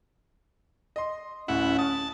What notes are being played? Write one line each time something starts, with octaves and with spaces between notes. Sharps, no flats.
D#5 C6
D1 C#4 E4 F#5
A5 D#6